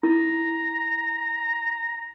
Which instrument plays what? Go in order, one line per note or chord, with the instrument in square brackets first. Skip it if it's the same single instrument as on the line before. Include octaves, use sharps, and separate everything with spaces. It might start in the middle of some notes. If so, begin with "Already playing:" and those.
[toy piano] E4 [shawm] A#5